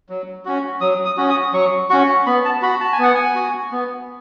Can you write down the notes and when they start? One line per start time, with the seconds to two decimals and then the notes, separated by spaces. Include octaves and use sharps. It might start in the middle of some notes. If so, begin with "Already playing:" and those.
0.09 F#3
0.45 C#4 F#4
0.81 F#3 D#6
1.05 D#6
1.17 C#4 F#4
1.30 D#6
1.53 F#3 C#6
1.90 C#4 F#4 C#6
2.26 B3 B5
2.45 A5
2.62 F#4 B5
2.81 A5
2.93 G#5
2.99 B3 F#5
3.14 G#5
3.35 F#4
3.71 B3